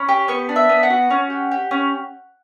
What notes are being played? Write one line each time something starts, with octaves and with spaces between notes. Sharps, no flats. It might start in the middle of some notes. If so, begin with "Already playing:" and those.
Already playing: C#4 B5
G4
B3 C#6
D4
E5
B3
F#5
F#4
C#4
G4
G4
C#4